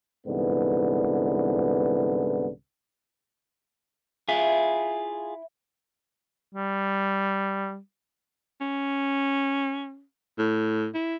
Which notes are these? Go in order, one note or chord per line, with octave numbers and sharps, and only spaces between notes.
C2 G#2 D3 E3 B3
E4 F4 G#4
G3
C#4
A2
E4